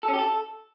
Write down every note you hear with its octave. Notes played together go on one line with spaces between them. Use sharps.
A4
C#4
G4
A4